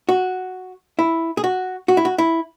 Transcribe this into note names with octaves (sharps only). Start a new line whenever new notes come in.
F#4
E4
G#4
F#4
F#4
E4
F#4
E4